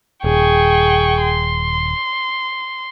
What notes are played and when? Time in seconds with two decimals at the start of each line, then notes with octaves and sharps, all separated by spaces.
0.24 D#1 G#4 G5 C#6
1.22 C6